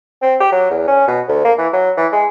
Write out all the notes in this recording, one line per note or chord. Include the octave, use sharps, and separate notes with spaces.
C4
G4
F#3
E2
C#4
B2
D2
A#3
E3
F#3
E3
G#3